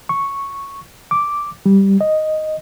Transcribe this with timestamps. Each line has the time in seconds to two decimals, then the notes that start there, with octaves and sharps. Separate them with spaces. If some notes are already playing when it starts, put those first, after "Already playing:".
0.09 C#6
1.11 D6
1.66 G3
2.01 D#5